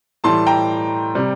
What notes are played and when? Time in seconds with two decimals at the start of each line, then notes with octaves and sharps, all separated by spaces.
0.24 A2 E3 G3 A5 C6
0.46 G5 A#5
1.15 C3 G3